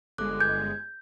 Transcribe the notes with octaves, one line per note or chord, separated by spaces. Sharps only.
G1 G#3 A4 D6 F#6
G6 G#6